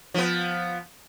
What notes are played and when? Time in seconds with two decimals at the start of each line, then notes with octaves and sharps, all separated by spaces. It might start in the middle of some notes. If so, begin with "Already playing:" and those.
0.14 F3 B3